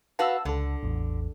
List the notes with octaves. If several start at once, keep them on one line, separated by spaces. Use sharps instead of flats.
F#4 B4 F5 A5 E6
C#2 D3 A4
A1 E2